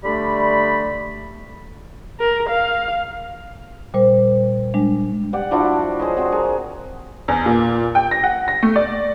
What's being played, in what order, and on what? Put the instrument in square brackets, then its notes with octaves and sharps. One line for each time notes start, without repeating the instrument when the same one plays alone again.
[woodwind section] D3 G3 A3 D5 B5
[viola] A#4
F5
[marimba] A#2 G3 C5
G3 G#3 D4
[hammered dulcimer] G4 D5 F#5
F3 D4 E4 F#4
G#4 C5 C#5 D#5
C4 F#4
G#4 A#4
[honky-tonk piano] E2
A#2
G5
A#6
F#5
A#6
A3
D5